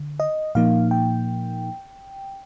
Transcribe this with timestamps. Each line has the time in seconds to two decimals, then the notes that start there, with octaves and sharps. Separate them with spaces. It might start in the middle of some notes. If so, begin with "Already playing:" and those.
Already playing: D3
0.20 D#5
0.55 A#2 F3 A#3 D#4 F5
0.91 G5